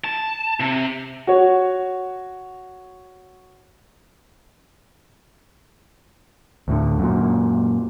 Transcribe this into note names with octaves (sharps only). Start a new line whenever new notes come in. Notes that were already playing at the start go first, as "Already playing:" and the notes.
A5
C3
F#4 C#5
D2 A2 D3
F#2 A#2